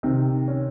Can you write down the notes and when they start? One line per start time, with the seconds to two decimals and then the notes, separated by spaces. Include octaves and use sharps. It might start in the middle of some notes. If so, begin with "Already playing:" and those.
0.03 C3 D#3
0.48 C#4